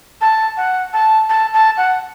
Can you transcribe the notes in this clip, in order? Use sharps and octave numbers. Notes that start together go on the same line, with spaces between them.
A5
F#5
A5
A5
A5
F#5